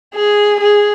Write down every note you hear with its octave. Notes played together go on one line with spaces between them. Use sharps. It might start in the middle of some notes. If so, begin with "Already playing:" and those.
G#4
G#4